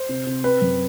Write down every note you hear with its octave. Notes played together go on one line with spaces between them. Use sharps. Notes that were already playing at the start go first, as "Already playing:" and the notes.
Already playing: C5
C3
C3
C4 B4
F#2